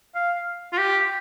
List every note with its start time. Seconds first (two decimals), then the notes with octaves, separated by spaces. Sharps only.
0.15 F5
0.72 F4
0.78 G4